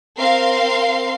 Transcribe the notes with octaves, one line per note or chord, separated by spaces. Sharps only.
C4 A#4 F5 C6 C7